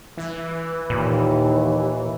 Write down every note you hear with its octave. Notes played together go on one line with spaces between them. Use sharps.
E3
D#2 A#2